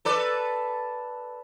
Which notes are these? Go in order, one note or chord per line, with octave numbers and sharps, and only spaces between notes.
A4 B4 D5